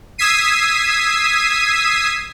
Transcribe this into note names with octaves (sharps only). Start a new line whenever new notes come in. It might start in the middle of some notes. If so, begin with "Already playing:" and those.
D#6 E6 G#6 B6 C7 D#7